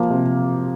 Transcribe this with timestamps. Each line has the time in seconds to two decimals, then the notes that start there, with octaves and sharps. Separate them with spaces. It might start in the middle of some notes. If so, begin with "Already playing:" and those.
Already playing: F3 A#3
0.10 C3